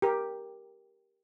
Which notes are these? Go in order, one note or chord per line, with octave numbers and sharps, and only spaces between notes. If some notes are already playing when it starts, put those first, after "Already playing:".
G4 A#4